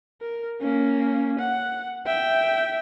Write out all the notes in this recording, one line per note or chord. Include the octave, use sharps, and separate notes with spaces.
A#4
A#3 C#4
F#5
E5 G5